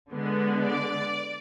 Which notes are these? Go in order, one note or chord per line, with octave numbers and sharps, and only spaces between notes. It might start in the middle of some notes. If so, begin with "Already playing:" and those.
D3 G#3 B3
D5